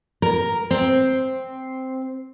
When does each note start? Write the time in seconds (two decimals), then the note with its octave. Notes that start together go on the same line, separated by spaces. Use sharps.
0.22 A#4
0.71 C4